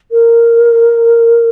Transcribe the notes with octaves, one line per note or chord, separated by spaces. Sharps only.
A#4